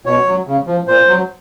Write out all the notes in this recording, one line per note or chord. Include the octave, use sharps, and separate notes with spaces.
B2 C#5
F#3
C#3
F3
A#2 C5
F#3